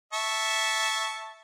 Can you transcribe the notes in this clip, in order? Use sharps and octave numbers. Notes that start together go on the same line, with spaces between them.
E5 A5 C#6